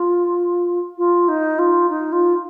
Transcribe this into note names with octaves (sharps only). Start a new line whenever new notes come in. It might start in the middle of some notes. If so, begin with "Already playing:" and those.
Already playing: F4
F4
D#4
F4
D#4
F4